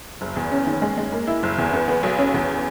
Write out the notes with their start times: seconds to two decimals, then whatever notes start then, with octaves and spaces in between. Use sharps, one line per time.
0.21 F#1
0.36 E2
0.52 C#4
0.67 D#3
0.82 G#3
0.97 G#3
1.12 A#3
1.27 E4
1.43 F#1
1.58 E2
1.73 B3
1.88 B3
2.03 B1
2.18 C#4
2.34 E2